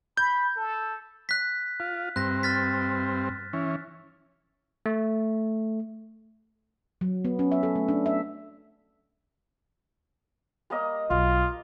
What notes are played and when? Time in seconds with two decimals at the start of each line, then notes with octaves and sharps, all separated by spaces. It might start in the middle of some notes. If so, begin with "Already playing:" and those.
0.17 B5 G6
0.56 A4
1.29 F#6 B6
1.80 F4
2.16 G2 C4 F#6 A#6
2.43 F6 A6 B6
3.53 E3 C#4
4.86 A3
7.01 F#3
7.25 B3
7.39 C#4
7.52 E5
7.63 A4
7.75 A3
7.88 D4
8.06 E5
10.70 G3 A#3 D#5
11.10 B1 F4